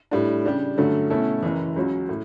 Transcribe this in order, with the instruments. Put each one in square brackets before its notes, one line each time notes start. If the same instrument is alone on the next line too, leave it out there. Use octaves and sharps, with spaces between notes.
[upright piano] A2 G3 D4
C#3 G3 D4 G4
G2 D3 F#3 A3 C#4
B2 A3 C#4 E4 A4
F#1 F#2 E3
C#2 C#3 F#3 C#4 F#4
A2